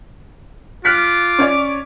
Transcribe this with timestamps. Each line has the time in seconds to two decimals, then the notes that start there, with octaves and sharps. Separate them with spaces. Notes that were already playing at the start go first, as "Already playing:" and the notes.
0.85 F4 D6 F6 F#6 B6
1.39 C#4 C#5 D5